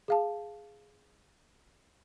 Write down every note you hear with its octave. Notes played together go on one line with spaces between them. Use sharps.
G#4 F5 A5